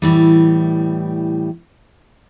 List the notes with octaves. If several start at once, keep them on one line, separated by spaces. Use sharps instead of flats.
A2 E3 G3